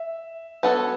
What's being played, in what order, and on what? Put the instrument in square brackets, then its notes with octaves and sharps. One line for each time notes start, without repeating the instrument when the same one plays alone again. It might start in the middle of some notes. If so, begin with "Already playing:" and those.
Already playing: [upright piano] E5
[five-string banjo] B3 F#4 A4 C#5